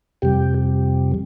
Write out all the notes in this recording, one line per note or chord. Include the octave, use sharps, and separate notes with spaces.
F2 C3 G3 G4